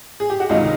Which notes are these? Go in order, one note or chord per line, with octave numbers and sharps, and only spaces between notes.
G#4
G4
F#4
C#2 C3 D#3 D#4 F4